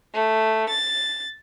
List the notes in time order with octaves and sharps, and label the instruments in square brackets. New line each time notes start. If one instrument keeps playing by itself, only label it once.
[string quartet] A3
A6